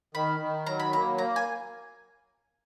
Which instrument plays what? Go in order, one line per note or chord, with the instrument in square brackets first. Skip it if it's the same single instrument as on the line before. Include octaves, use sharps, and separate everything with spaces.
[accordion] D#3 [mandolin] B5
[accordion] D#3
[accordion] F#3 [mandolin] A#5
[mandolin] B5
[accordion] A#3 [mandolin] A#5
[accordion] A#3 [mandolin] A#5
[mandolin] G#5